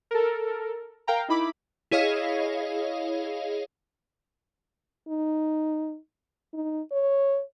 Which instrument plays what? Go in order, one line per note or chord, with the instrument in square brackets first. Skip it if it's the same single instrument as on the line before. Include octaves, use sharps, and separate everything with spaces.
[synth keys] A4 A#4
A#4 F5 G5 A#5
D#4 E4 B5 D6
[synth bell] E4 G#4 C#5 D#5 F5
[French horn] D#4
D#4
C#5